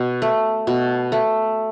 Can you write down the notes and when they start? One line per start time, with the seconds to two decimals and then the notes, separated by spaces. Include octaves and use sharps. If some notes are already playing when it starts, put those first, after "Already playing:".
Already playing: B2
0.22 A3
0.67 B2
1.12 A3